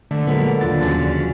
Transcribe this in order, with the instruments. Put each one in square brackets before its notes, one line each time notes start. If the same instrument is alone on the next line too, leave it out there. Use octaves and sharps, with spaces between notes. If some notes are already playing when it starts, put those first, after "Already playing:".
[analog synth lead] D3 [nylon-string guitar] A3
[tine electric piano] A#2 F#3 G#3 [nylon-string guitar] B3 G#4 A#4
[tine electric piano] D#2 F4 A6
[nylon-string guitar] F2 C#3 F#3